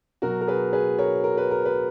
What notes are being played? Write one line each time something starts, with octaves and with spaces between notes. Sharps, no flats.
B2 F#3 F#4 A#4
A#4
G#4 B4
G#4 B4
A#4 C#5
A#4
B4
A#4
B4